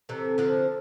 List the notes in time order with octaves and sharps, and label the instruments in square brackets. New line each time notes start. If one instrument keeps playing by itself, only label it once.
[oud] C3 E3 [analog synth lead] A4
[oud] D3 F3